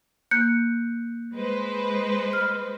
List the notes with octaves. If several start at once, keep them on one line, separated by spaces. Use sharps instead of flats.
A#3 F#6 G6 C#7
G#3 B4 C5
F6